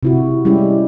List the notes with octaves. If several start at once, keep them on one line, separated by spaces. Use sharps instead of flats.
C3 E4 F#4
G3 G#3 C#4 E4 G4